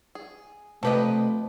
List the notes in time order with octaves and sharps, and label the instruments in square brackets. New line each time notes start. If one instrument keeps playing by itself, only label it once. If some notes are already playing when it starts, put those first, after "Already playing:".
[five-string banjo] G#4
[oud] C3 B4 D#5 [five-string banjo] F3 G4 B5 [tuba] A3